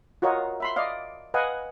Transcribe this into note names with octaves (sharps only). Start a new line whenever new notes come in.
F4 F#4 A#4 C#5 D#5
E5 B5 C6
D5 D#5 F5
B4 D#5 F5 F#5 G#5